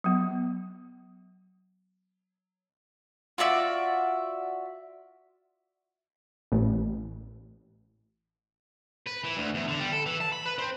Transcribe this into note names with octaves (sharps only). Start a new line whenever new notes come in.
F#3 B3
F4 F#4 D5 E5
A1
B4
E3
D2
E2
D3
G3
A4
E3
A5
B5
B4
C4